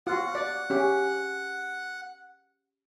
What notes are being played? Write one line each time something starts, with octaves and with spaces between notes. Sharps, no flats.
F4 F#4 F#5
D5
C#4 G4